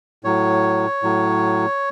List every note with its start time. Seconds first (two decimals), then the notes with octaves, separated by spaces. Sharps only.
0.24 A2 F#3 C#5
1.03 A2 F#3